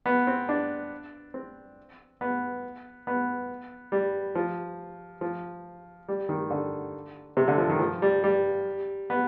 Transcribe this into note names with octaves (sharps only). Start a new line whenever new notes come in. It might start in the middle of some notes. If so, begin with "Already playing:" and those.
B3
C4
D4
C4
B3
B3
G3
F3
F3
G3
D#3
D3
C3
D3
F3
D#3
F3
G3
G3
B3